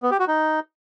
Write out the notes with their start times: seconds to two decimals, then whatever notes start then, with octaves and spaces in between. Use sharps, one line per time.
0.03 B3
0.11 G4
0.20 F#4
0.28 D#4